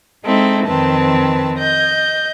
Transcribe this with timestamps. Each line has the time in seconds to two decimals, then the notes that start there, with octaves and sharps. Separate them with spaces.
0.25 G#3 C4 D#4 E4 A4
0.66 F2 D#3 C4 B4 A5
1.57 D#5 G6